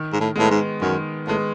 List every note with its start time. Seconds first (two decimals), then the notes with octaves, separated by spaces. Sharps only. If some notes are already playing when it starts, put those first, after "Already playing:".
Already playing: D#3
0.13 G#2
0.20 A2
0.36 A2 G#3 B3
0.51 G#2
0.81 F#2 D#3
1.27 A2 G#3 B3